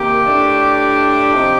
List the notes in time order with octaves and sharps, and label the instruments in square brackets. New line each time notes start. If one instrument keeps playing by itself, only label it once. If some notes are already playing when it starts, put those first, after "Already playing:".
Already playing: [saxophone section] C3 D#3 A#3 D#4 [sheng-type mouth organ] G4
[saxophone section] A2 A3 D4
C3 F3 C4 D#4